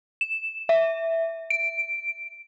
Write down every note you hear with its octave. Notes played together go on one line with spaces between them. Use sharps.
E7
E5
D7